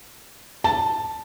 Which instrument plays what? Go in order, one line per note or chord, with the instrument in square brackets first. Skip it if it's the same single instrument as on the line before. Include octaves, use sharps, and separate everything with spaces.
[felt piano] A5